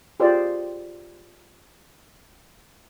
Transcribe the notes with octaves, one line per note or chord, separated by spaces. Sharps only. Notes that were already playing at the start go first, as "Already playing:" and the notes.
F4 G4 G#4 C5 D5